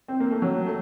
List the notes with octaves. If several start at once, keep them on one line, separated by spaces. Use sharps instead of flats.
C4
A#3
A3
F#3
A3